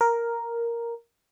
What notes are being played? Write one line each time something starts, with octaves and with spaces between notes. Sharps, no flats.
A#4